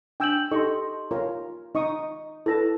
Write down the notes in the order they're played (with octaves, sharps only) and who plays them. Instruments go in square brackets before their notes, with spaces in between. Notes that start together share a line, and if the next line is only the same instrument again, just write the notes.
[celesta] D4 G6 F#7 [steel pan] G5 G#5 E6
[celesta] D#4 G4 C6 [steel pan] A4 D#5 C#6
[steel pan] F4 A#4 C#5
[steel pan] D#4 C#6 D#6 [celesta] D#5
[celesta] E4 A#6 [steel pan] A4 B4 A5